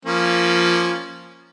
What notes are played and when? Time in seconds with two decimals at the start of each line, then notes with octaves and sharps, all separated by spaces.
0.05 F3 A#3 C#4